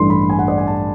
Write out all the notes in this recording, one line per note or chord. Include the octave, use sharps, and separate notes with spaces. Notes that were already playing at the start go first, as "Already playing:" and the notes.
Already playing: A1 G2 E3 A3 C6
B5
G#5
F#5
D5
G#5
A5